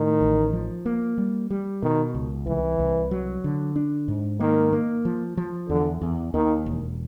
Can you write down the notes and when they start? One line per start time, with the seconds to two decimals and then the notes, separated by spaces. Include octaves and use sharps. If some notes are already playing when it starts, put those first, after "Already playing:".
Already playing: A2 D#3
0.21 A1
0.53 F3
0.85 A#3
1.18 G3
1.50 G3
1.82 B2 D#3
2.15 C#2
2.47 C2 E3
2.79 C2
3.11 F#3
3.44 D3
3.76 D4
4.08 G#2
4.40 D#3 A#3
4.73 A#3
5.05 F3
5.37 F3
5.69 E2 D3
6.01 E2
6.33 D#2 D#3
6.66 E1